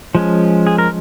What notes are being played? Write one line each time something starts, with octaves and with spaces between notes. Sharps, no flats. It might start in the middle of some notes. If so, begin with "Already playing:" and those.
F3 G#3 C#4
G#4
A#4